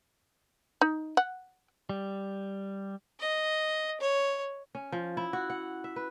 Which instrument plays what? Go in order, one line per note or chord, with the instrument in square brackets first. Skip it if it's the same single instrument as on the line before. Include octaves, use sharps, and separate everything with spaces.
[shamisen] D#4
F#5
[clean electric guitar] G3
[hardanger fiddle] D#5
C#5
[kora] C#4
F3
E4
F#4
F#5
E5
B4